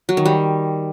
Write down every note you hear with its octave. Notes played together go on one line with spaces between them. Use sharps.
F#3
D#3
G3